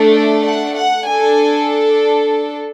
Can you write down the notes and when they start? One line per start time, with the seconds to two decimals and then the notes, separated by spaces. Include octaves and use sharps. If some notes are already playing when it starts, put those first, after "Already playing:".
Already playing: A3 D4 A4
0.14 D5
0.45 F#5
0.76 F#5
1.07 D4 A4 G#5